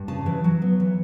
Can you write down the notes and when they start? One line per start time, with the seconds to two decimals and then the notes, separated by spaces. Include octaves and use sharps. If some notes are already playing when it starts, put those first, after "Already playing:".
Already playing: G2
0.08 C#3 A5
0.26 E3
0.44 F#3
0.62 B3
0.80 E3